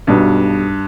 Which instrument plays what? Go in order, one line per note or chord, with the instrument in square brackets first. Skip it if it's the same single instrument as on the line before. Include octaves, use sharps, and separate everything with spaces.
[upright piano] B1 B2 G3 [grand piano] G2